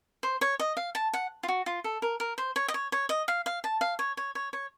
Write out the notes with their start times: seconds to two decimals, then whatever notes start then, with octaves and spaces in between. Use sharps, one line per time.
0.23 C5
0.41 C#5
0.59 D#5
0.77 F5
0.95 A5
1.13 F#5
1.43 F4
1.48 F#4
1.66 F4
1.84 A4
2.02 A#4
2.20 A#4
2.38 C5
2.56 C#5
2.68 D#5
2.74 C#5
2.92 C#5
3.09 D#5
3.28 F5
3.46 F5
3.64 A5
3.81 F5
3.99 C#5
4.17 C#5
4.35 C#5
4.53 C#5